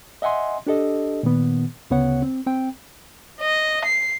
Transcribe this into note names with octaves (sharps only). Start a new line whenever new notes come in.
D#5 E5 F#5 G#5 C6
D4 G4 A4 D#5
A#2 D#3 B3
D2 C#3 B3 C#5 F#5
C4
C4 G5
D#5
C7